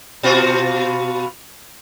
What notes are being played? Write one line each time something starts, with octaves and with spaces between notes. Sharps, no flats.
B2 F4 F#4